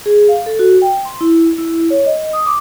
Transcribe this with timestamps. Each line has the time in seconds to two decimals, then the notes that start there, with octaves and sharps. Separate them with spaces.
0.06 G#4
0.29 F5
0.46 A4
0.59 F#4
0.82 G5
1.05 C6
1.21 E4
1.58 E4
1.90 C#5
2.06 D#5
2.33 D#6
2.46 D6